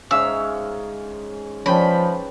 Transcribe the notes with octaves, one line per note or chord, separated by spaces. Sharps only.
G#2 C#4 E5 F5 E6
F3 C#4 B4 D5 G5 B5